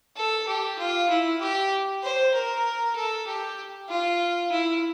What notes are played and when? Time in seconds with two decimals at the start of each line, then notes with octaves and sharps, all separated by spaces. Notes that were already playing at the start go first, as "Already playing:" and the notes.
0.16 A4
0.48 G4
0.79 F4
1.10 E4
1.41 G4
2.03 C5
2.34 A#4
2.96 A4
3.27 G4
3.89 F4
4.51 E4